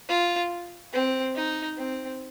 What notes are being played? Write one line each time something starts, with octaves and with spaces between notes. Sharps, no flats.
F4
C4
D#4
C4